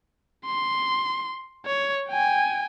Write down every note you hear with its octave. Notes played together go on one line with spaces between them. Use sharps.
C6
C#5
G5 G#5